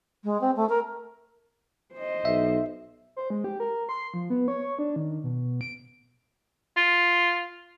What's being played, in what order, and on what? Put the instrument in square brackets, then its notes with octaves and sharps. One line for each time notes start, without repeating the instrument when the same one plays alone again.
[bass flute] G#3
C4
A3
A#4
[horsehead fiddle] C5 D#5
[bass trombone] B1 [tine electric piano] E5
[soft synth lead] C5
G#3
G4
A#4
C6
F3
B3
C#5
D4
D#3
B2
D7
[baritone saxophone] F4